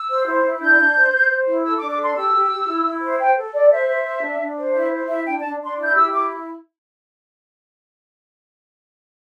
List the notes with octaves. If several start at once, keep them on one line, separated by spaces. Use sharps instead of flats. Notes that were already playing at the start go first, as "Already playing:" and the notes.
Already playing: E6
C5
E4
E4
D4 G6
D4
C5
C5
C5
E4
A4 E6
D6
D4
D6
A4 C6
G4 E6
G4
G4
E4
E4
C5
C5 G5
A4
A4 D5
C5 E5
C5
C5
D4
D4
C5
E4 E5
C5
E4 E5
D4 G5
A5
D4
D4 C6
E4
G6
G4 E6
E4 D6